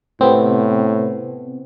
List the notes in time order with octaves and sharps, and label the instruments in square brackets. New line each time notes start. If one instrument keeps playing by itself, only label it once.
[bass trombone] A2 [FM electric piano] C3 B3 C4